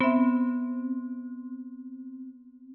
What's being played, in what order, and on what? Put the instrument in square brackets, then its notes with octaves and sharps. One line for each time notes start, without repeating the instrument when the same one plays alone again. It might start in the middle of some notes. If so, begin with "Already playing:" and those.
[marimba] B3 E5 [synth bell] C4